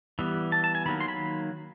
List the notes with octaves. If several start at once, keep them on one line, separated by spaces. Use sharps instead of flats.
E3 G3 B3
A5
A5
G#5
D#3 F#3 A#3 B5
C6
B5